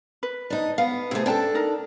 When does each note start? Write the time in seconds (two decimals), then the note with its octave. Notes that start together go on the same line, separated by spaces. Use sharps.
0.23 B4
0.50 D4 D#4
0.78 B3 F5
1.11 C3 A3 E4 G#4
1.26 C#4 D4 A4 G5 A5
1.55 D#4 A#4